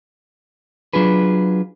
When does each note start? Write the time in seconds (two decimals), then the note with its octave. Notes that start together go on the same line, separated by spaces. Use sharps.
0.93 F#3 D4 F4 G#4 B4